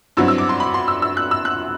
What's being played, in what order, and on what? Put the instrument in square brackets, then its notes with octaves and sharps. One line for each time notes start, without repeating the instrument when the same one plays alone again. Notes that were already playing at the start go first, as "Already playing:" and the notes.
[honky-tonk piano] G2 F#3 C4 E4 E6
E6
D6
C6
B5
C6
E6
E6
F#6
E6
F#6